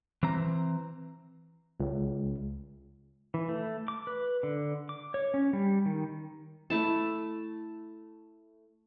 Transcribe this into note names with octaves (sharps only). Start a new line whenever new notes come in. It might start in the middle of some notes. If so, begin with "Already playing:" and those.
E3 C4 A#5
C#2
E3
A3
D6
B4
D3
D6
C#5
C#4
G3
D#3
A3 E4 A5